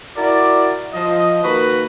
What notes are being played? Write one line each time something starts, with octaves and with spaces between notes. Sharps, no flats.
E4 F#4 A#4 D5
F3 D#5
D#3 A#3 F#4 B4